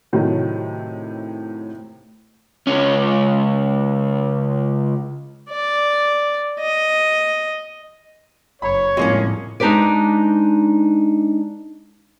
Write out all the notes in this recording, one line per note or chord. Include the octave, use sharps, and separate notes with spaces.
A2 C3 D#3 F#3
C#2 C#4
D5
D#5
F#1 C#5 B5
C2 F2 A2 G#3 A#3 C#4
G#3 D4 D#4 G4 B4 D5